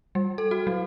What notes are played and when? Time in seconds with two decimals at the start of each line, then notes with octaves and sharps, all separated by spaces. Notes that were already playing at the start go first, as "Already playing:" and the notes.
0.15 G3
0.38 A4
0.51 F#4
0.67 F#3